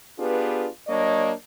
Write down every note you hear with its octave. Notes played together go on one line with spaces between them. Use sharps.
B3 D4 F4 G4 G#4 B4
F#3 A#3 D4 C#5 D#5